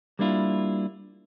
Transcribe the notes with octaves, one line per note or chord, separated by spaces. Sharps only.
G3 A#3 D4 E4 F4